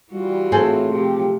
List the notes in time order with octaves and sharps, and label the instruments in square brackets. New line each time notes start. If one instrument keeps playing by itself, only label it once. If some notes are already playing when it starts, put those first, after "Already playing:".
[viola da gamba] E3 F4 F#4 [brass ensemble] G3
[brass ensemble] A2 [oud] C4 G#4 A4
[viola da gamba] C3 F3 A3 [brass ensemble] G4